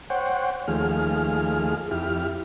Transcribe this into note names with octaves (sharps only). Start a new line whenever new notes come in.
C5 C#5 F#5 G5
D#2 F3 A3 G#4 F6
F2 E4 G4 F6